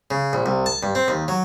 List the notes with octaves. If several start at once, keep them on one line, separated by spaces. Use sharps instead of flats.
C#3
A#1
C2
A5
G2
C4
D#2
F#3